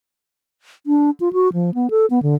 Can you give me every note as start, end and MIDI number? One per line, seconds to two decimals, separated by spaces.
0.87 1.10 62
1.20 1.33 65
1.33 1.52 66
1.53 1.74 53
1.74 1.90 59
1.90 2.06 69
2.10 2.22 59
2.23 2.35 50